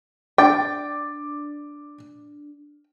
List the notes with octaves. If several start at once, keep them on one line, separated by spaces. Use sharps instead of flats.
D4 G5 D6 A6